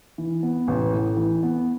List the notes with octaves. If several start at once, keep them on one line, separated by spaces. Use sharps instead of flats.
E3
B3
A1
A2
E3
B3